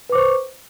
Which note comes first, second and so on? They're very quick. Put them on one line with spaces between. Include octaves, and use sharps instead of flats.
B4 D6 C5 C#6